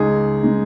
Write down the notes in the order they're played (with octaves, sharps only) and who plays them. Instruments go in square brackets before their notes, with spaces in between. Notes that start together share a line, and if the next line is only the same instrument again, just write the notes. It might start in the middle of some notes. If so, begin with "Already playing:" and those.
Already playing: [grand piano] C#2 C#3 G#3 D#4 G#4
C#3 G#3 D#4